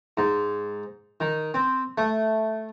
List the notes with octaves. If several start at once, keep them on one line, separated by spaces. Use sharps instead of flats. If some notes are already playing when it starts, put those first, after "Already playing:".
G#2
D#3
C4
A3